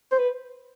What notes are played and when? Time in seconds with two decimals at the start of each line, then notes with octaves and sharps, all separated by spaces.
0.12 C5
0.19 B4